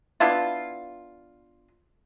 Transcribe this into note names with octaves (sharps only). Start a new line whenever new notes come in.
B3 D4 E4 F4